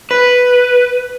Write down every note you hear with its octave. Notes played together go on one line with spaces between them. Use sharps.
B4